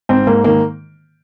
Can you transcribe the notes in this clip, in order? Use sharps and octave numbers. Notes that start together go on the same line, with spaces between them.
G#2 C4
G#2 A#3
D#3 A#3